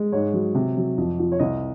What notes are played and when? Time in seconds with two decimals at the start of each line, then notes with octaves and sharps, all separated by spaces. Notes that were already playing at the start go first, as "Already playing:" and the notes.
Already playing: G#3
0.12 G#2 C#5
0.34 F#3
0.55 C3
0.77 F#3
0.98 F2
1.19 F3
1.32 C#5
1.39 C2 D#5